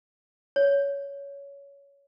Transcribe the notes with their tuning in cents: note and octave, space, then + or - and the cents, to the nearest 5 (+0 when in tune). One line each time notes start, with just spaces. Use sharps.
C#5 +15